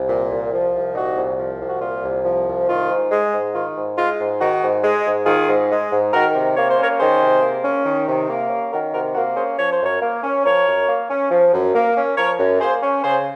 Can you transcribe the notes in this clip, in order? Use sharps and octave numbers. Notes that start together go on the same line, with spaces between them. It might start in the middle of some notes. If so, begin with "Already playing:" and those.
Already playing: C2
A#2
C2
F3
C2
A#2 D#4 F#4
C2
F3
C2
F#4
A#2 F4
C2
F3
C2
D#3 F4
G#2
G#3
G#2
D#3 F4
G#2
G#3 F4
G#2
D#3 D#4 F#4
G#2
G#3
G#2
D#3 F4 G#4
G#2
G#3
G#2
D#3 F#4 A#4
C3
A#3 C#5
C5
C#4 A#4 C#5
D#3 G#4 C5
C3
A#3
C#4
D#3
C3
A#3
C#4
D#3 F#4 A#4
C3 F#4 A#4
A#3 F#4 A#4
C#4 G#4 C5
F3 C#5
C5
F#2 A#4 C#5
A#3
C#4
F3 A#4 C#5
F#2
A#3
C#4
F3
F#2
A#3
C#4
F3 A#4 C#5
F#2
A#3 G#4 C5
C#4
C#3 G#4 C5